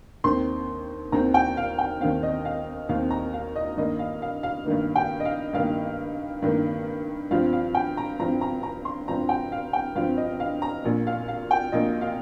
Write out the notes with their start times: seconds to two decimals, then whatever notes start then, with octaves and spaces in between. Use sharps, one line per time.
0.24 D#2 D#3 C4 C6
1.12 D#2 D#3 C4 A#5
1.34 G5
1.57 F5
1.79 G5
2.01 D#2 D#3 C4 F5
2.23 D#5
2.45 F5
2.89 D#2 D#3 C4 F5
3.11 A#5
3.34 F5
3.56 D#5
3.77 G2 D#3 A#3 D#5
3.99 F5
4.22 F5
4.43 F5
4.66 G2 D#3 A#3
4.96 G5
5.20 D#5
5.25 F5
5.53 G2 D#3 A#3 F5
6.42 G2 D#3 A#3
7.31 G2 F3 C4 F5
7.53 F5
7.75 G5
7.97 A#5
8.20 G2 F3 C4 A#5
8.41 A#5
8.63 A#5
8.85 C6
9.08 G2 F3 C4 A#5
9.29 G5
9.52 F5
9.73 G5
9.95 G2 F3 C4 F5
10.17 D#5
10.40 F5
10.62 A#5
10.84 A#1 A#2 A#3
11.07 F5
11.28 F5
11.51 G5
11.72 A#1 A#2 A#3 D#5
12.01 F5